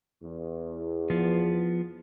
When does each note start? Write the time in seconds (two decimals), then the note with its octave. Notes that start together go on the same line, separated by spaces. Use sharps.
0.24 E2
1.10 F3 B3